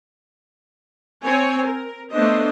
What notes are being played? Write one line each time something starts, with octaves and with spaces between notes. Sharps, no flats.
C4 C#5 G#5
A#4
A3 B3 D4 C5 D#5